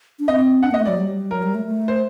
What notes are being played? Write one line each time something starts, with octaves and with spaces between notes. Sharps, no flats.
D4
C4 D#5
D4 F#5
A#3 D#5
A3
F#3 D5
G3
F#3 A#4
G3
A3
A3
C5